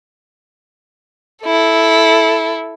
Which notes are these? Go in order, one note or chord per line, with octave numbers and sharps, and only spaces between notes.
E4 A4